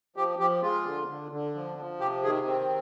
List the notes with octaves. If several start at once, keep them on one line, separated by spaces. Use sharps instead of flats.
F3 G4
F3 G4
G#3 F4
D3
D3
D3
F3
F3
C3 G4
D#3 G#4
C4